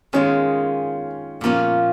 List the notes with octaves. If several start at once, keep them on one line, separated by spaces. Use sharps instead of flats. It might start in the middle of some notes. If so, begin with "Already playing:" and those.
D#3 G#3 C#4 F4
A#2 F3 A#3 C#4 F4